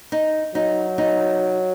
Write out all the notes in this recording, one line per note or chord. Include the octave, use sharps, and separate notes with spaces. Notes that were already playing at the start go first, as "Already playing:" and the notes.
D#4
F#3 D#4
D#4